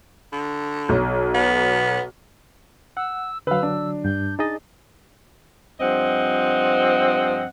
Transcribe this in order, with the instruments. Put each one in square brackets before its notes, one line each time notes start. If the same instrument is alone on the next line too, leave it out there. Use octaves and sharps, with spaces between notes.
[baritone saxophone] D3
[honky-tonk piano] B1
[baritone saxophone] B3
[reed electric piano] F#5 [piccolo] E6
[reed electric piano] D3 F#3 [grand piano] B4 F5 [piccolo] E6
[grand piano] D4
[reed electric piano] G2 [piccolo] G6
[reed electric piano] D#4 G#4 D#5 [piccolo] A6
[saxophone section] G2 F3 C4 D#5 F#5